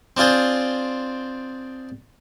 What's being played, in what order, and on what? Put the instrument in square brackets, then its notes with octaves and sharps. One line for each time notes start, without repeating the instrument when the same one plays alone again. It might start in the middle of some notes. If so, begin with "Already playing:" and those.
[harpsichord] C4 D4 F4 G#4 C5